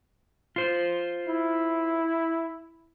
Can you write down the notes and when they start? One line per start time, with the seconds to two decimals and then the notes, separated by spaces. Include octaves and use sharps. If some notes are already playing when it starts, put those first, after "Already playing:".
0.56 F4 C5
1.28 E4